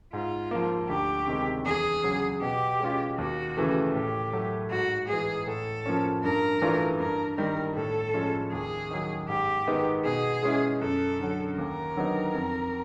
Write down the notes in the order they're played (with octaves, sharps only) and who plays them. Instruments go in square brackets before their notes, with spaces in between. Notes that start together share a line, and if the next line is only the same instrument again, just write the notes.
[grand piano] G#2 [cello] F4
[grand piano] F3 A#3
[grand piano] D2 [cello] G4
[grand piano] C3 D#3 G#3
[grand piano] E2 [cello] G#4
[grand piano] C#3 F#3
[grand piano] B2 [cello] G4
[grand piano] G#3 C#4 F4
[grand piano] D#2 [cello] F#4
[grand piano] C#3 E3 A3
[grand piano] A2 [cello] G4
[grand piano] F#3 A3
[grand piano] G#2 [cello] F#4
[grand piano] E3 G#3 [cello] G#4
[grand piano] A2 [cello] A4
[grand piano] F3 A#3 C#4
[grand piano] G2 [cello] A#4
[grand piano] E3 A3 D4 F4
[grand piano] G2 [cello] A#4
[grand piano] D#3 G3 [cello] A#4
[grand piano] A2 [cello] A4
[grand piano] F3 G#3 C#4
[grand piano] D#2 [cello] G#4
[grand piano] D#3 F#3
[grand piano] G#2 [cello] G4
[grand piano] D#3 G#3 B3 D#4
[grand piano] B2 [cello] G#4
[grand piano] G#3 C#4 E4
[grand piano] F#2 [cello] A4
[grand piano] D3 F#3
[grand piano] D#2 [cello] A#4
[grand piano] D3 F#3 B3 D#4
F2